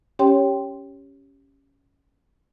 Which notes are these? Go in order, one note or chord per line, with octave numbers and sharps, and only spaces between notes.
C#4 G4 C#5 G5 C6